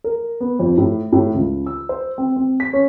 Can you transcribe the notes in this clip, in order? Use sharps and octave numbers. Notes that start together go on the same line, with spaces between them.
A#4
B3
F2
A2
A2
C#2
E6
C5
C4
C4
B6
C#4